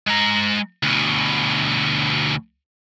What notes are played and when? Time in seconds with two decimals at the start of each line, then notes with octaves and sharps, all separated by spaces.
0.07 G#3 A#5
0.83 D2 B2